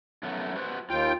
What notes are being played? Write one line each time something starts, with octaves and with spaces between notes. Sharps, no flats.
F#2 A3 B3
F#4 B4 C5
D#2 F4 G5